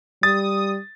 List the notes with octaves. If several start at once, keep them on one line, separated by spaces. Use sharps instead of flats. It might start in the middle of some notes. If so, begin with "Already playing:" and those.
G3 D#6 A6